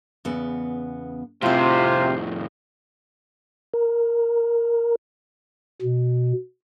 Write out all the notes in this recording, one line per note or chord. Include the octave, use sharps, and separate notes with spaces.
E2 C#3 B3
F2 A2 C3 C4 F4 G#4 C5
A#4
B2